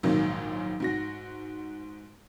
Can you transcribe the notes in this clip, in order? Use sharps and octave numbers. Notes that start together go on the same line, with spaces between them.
A#1 G#2 D#3 F#3 A#3
G#2 F#4 A#6